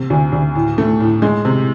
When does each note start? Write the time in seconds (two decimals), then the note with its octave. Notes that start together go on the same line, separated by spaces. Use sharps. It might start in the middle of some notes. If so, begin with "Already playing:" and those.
Already playing: C3
0.10 D2
0.32 D2
0.55 A2
0.78 A3
1.00 A2
1.22 G#3
1.45 C3